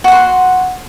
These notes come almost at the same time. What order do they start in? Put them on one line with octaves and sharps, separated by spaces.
F#4 F#5 C6